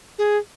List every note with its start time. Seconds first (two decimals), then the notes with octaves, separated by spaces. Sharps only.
0.19 G#4